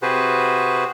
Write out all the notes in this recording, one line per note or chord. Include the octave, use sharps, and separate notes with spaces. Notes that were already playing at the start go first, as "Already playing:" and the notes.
C3 F#4 G#4 B4 C5